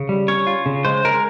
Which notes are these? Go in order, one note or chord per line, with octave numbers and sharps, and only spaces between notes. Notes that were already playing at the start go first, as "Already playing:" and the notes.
Already playing: C#3
G3
C#4 C#5
F4
C#3
G#3 C5
G#3 A#4